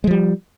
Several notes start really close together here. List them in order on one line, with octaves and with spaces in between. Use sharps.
G#3 F3 G3